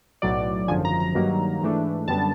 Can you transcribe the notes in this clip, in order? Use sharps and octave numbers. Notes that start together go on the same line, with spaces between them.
B1 A2 F#3 D5
G#1 F#2 D3 F3 G#5
A#5
A#5
G2 D#3 F#3 A#3
G#2 E3 A3 D4
F#2 D3 G3 B3 A5